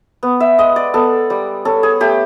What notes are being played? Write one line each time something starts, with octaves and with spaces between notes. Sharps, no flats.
B3
E5
G#3 D#5
D5
B3 A4
G3
C#4 A4
G#4
A3 G4